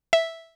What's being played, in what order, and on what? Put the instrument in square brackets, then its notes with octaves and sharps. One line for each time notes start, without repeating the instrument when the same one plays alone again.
[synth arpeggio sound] E5